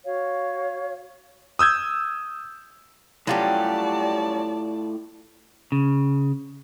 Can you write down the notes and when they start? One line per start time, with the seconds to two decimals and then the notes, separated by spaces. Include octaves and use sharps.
0.06 F#4 C#5 F5
1.59 D#6 E6 G6 G#6
3.27 A2 F#3 G3 C#4 F4 G4 D5 A5
5.72 C#3